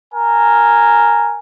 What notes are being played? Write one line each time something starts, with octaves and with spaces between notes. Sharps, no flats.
A#4 G#5